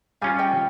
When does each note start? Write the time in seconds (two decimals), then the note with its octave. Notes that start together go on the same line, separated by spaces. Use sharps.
0.21 G3 C#4 F4 F5 G#5
0.39 D#5 G5